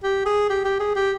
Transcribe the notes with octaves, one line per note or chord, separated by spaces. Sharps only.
G4
G#4
G4
G4
G#4
G4